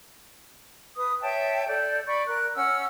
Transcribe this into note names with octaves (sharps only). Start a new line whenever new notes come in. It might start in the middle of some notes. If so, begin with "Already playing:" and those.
B4 D#6
C#5 E5 G5 A5
A4 D5 G6
D5 B5 C#6
A#4 F#6
C#4 F#5 E6 F6